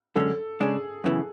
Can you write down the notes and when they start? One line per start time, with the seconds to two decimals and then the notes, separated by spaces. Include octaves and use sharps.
0.15 F#2 D3 G#3 C#4 A4
0.60 C#3 G#3 D4 G#4
1.04 F#2 C#3 E3 B3